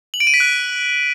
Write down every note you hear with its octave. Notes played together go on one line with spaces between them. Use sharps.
F#7
D7
D#7
B6
F#6